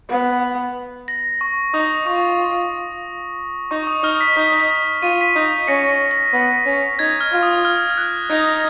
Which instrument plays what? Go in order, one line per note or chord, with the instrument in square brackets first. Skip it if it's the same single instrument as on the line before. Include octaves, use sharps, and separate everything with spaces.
[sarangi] B3
[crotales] A#6
C#6
[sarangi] D#4 [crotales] D#6
[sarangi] F4 [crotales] C#6
[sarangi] D#4 [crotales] C#6
[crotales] D#6
[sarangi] D#4 [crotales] F6
[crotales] B6
[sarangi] D#4 [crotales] B6
[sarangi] F4 [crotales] D#7
[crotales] B6 D#7
[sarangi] D#4
[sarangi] C#4 [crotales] A#6 C#7
[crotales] A#6
A#6
[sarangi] B3
C#4
[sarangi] D#4 [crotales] G#6
[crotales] F6
[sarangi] F4
[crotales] D#6
D#6
F6
F6
F#6
[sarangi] D#4 [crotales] G#6